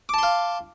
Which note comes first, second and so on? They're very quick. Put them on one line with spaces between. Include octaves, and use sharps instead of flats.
D6 A5 C6 F5